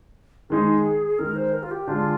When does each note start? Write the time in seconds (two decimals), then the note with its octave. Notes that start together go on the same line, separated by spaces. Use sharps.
0.50 D#3 G#3 D#4 G#4
1.19 D#3 G#3 D#4 A#4
1.36 C5
1.54 A#4
1.63 F4
1.71 G4
1.88 D3 G#3 D4 F4